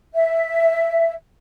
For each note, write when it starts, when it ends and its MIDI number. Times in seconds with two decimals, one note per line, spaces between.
0.14 1.12 76